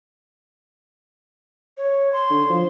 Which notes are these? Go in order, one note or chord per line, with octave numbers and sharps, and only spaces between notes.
C#5
C6
D3
F3